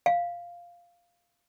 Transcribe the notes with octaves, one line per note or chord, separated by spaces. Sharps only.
F5